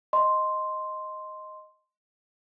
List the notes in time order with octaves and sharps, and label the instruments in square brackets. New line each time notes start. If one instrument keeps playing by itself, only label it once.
[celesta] D#5 C6